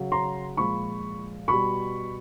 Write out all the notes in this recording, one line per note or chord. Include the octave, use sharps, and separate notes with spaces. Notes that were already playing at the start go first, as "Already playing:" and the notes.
Already playing: C#3 F#3
A#5 C6
A#2 F3 G#3 B5 C#6
B2 G3 B5 C#6